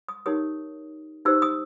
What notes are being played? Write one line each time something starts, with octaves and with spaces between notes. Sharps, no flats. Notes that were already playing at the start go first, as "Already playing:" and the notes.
D#6
D#4 G4 A#4 C#5 D#6
D#4 G4 C5 E6
D#6